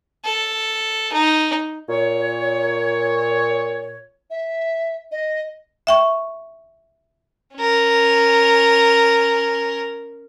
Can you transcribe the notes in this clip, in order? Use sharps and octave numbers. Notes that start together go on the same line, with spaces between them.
A4
D#4
A#2 C#5
E5
D#5
E5 G5 C#6
C#4 A#4